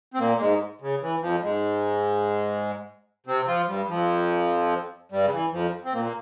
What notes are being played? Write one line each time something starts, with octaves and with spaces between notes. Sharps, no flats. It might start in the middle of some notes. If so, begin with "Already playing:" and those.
C4
A#2 A#3
A#3
G#2 G#3
C#3
E3
F2 F3
G#2 G#3
C3 C4
F3 F4
G2 G3
F2 F3
G2 G3
C#3
E3
F2 F3
C4
A#2 A#3
A#3